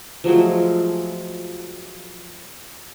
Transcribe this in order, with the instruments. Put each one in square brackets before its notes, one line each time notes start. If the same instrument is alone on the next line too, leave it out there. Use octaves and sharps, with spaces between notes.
[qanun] F3 F#3 G#3 A3